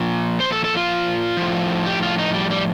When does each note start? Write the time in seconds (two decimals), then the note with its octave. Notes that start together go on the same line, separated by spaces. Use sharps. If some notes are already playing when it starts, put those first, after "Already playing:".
Already playing: A#2 F3
0.40 C5
0.52 A4
0.64 A4
0.77 F4
1.37 A2 F3
1.86 G4
2.03 F4
2.19 D#4
2.34 G3
2.51 G3